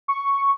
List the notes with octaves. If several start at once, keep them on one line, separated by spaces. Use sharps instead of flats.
C#6